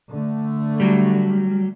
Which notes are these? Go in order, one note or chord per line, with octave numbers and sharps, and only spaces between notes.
D3 A3
F#3 G3